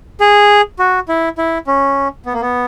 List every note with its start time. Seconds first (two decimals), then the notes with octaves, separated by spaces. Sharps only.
0.20 G#4
0.79 F#4
1.08 E4
1.38 E4
1.67 C#4
2.26 B3
2.33 A#3
2.41 B3